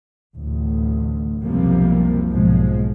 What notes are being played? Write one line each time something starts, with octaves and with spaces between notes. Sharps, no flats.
A1 D2
B1 F2 C3 F3 G3 A#3
B1 G#2 F3 G#3